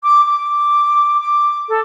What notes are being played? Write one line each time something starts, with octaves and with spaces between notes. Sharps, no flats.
D6
D6
D6
A4